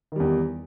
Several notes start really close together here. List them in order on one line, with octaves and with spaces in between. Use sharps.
D#3 G3 E2